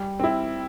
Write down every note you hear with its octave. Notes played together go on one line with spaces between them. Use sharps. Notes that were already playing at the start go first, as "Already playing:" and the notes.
Already playing: G3
C4 E4